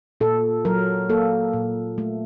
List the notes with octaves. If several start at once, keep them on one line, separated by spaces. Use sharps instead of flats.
A#2 A4
F#3 A#4
A#3 A4
A#2
A3